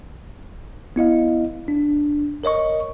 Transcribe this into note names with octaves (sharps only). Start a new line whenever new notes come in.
B3 E4 D#5 F5
D4
A#4 C#5 D#5 C#6